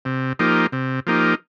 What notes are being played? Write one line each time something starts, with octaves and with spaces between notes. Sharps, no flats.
C3
F3 A#3 D#4 G4
C3
F3 A#3 D#4 G4